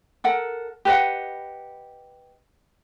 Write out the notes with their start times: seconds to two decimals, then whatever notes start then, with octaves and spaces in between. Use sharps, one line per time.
0.24 A4 A#4 F#5
0.85 G4 B4 D#5 F#5